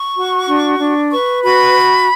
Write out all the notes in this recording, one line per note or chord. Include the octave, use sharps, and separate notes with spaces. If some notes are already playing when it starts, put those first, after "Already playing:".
Already playing: C#6
F#4
D4
D4
B4 C#6
F#4 B5